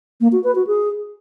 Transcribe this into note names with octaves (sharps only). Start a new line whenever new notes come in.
A#3
F#4
B4
F#4
G#4